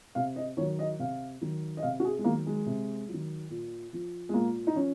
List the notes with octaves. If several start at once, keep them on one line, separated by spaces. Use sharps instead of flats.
C3 F5
D#5
D#3 F#3 C#5
D#5
C3 F5
D#3 F#3
D#5
C3 F5
F#4
G#4
G#3
D#3 F#3 A#3
G#3
C3
D#3 F#3
A#2
F3
G#3
A#2 A#3
D#4
F3 C#4